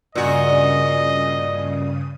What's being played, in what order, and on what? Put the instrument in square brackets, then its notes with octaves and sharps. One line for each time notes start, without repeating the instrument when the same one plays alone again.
[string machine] G2 C#3 D#6 [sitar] A#2 F#4 [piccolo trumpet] D#5